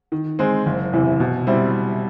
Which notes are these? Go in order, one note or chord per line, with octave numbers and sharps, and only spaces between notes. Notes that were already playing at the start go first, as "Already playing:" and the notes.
D#3
G#3 C4
F#1
E2 C3 E3
B2
G3 C4 E4